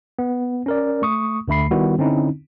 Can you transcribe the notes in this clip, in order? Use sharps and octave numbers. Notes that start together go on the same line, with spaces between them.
B3
C#4 A#4 D5
A3 C#6 D#6
D2 D3 A3 B5 C7
D#3 G3 B3 E4 F#4
D3 C4 C#4 D#4 E4